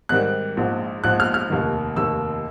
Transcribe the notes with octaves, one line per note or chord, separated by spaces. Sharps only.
G#2 D#3 G3 C4 F#6
A#1 G#2 F3
A#1 G#2 F3 F#6
F6
F6
F1 D#2 D#3
F1 D#2 D#3 E6